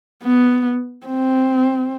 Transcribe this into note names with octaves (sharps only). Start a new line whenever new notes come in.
B3
C4